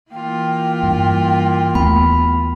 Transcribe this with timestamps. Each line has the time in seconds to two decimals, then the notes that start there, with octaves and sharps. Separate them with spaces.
0.12 E3 A#3 F4 G5
0.83 G2
1.75 D#2 A3 B3 B5